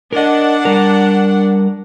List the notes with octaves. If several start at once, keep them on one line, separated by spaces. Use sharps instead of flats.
D4 A#4 D#5 F#5
G3 A#4